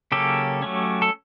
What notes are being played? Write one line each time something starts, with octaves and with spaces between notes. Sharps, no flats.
C#3 F#3 A#3 C#4 G4 A4
F#3 A3 C#4
A4